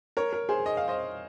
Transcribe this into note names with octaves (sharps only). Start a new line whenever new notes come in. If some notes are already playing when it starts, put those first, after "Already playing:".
A#4 C#5
A#4
G#4 C5
D#5
F5
C5 D#5